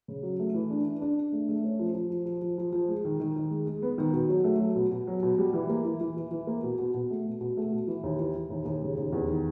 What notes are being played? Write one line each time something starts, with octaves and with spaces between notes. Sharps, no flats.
C#3
F#3
A3
E3
D4
D4
D4
D4
A3
A3
C#4
F3
F3
F3
F3
F3
F3
F3
G#3
D#3
D#3
D#3
G#3
G#3
B3
D#3
B2
F#3
A3
F#3
B2
B2
F#3
B2
G3
E3
A#3
E3
E3
E3
E3
A#3
B2
B2
B2
A3
B2
B2
A3
B2
E3
D#2
E3
E3
D#2
D#2
C#3
D#2
E2
D#3